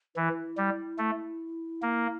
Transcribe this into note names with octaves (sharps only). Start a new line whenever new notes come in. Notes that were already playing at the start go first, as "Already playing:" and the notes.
E3 E4
G3
A3
A#3